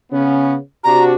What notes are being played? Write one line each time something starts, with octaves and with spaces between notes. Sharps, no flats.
C#3 B3 C#4
C3 D4 F#4 A#5